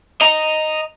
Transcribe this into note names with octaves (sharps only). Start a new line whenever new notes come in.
D#5 A#5